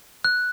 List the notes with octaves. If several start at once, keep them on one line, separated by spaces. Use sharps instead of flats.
F#6